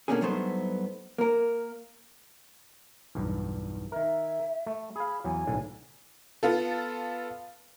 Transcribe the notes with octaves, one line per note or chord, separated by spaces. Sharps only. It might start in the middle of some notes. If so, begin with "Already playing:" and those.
B2 D3 A#3 C#4 D4 G#4
G2 F#3 A3 B3 D#4 C5
A#3 A#4
B1 E2 G2
D#3 A#4 E5
A3
G#4 F5 B5
E2 F#3 G#5
B1 A2 D3
B3 F4 A4